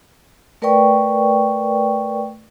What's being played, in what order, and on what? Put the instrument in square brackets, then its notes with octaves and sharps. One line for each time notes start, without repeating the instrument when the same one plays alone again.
[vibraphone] A3 A#4 B4 D5 G5 C#6